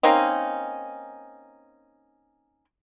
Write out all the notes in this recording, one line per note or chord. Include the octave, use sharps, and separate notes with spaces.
A#3 C4 C#4 D#4